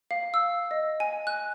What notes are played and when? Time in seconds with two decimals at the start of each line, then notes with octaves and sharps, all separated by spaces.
0.11 F5
0.34 E6
0.71 D#5
1.00 G#5
1.27 F#6